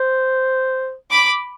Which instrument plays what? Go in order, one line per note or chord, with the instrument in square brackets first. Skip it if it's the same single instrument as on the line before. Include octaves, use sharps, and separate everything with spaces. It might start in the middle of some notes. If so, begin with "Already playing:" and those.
Already playing: [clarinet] C5
[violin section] B5 D6